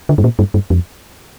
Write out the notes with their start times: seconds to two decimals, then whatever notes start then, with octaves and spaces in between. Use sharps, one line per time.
0.09 D3
0.18 G2
0.24 A#2
0.39 G2
0.54 G2
0.70 F2